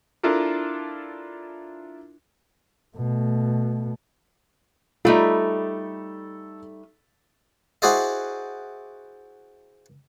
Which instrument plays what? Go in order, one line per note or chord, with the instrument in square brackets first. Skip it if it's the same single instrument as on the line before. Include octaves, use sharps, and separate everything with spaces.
[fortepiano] D4 E4 F4 A4 A#4
[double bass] B2 A3
[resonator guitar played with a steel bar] G3 A3 D#4 [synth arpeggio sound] F4 [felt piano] A4 B5
[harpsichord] E4 F#4 G#4 C5 D5 D#5